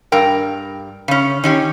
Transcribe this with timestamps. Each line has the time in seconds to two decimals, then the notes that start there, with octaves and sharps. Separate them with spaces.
0.12 G2 A#4 G5
1.08 C#3 C#4
1.44 D#3 C#4 G4